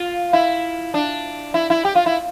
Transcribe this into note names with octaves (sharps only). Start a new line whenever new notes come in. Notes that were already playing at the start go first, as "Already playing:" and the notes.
Already playing: F4
E4
D4
E4
E4
G4
F4
E4